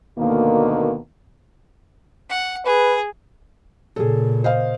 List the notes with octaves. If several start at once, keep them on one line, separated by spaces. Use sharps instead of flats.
D2 B2 D#3 A#3
F#5
G#4 B4
A#2 C#3 G#4 A4
C5 D#5 F5